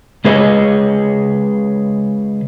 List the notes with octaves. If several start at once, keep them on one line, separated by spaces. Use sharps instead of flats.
C#3 G#3 G#4 B4 C#5 D#5